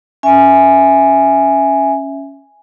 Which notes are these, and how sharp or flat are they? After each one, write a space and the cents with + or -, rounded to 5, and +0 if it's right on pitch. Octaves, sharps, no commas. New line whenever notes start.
C#4 +0 E5 +0 G#5 +0